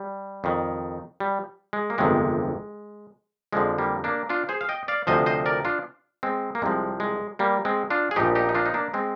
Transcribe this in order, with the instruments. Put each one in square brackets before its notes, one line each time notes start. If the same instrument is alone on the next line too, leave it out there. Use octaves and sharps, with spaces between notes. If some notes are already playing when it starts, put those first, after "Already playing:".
Already playing: [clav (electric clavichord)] G3
F2 D#3
G3
G#3
A#3
G1 F2 C3 D#3 G#3
F2 D3 F3 G#3
G3 A#3
A#3 D4
D4 F4
G#4 C5
F5
D#5 G5
D5 F5
D2 C3 F3 C5 D#5
C5 D#5
A#4 D5
D4 F4
G#3 C4
A#3
C2 C3 F3 G#3
G#3
G3 A#3
G#3 C4
D4 F4
G#4
A#1 A#2 F3 D#4 G4
D#4 G4
D#4
D4 F4
D#4
A#3 D4
G#3 C4